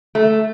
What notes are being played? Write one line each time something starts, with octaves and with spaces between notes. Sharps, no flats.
A3